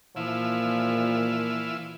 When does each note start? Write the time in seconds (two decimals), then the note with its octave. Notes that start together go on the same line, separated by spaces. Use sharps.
0.16 A#2 E3 F3 E4 F4